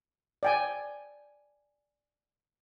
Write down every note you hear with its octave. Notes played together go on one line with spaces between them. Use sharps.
D5 G5 G#5